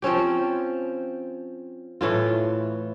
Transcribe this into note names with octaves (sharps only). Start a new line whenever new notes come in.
F3 C4 C#4 G4
A2 E3 F4